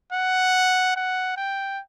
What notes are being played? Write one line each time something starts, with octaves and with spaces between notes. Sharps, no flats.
F#5
F#5
G5